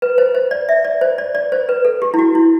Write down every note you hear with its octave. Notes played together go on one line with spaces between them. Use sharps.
B4
C5
C5
D5
E5
D5
C5
D5
D5
C5
B4
A4
G4
E4
F#4
E4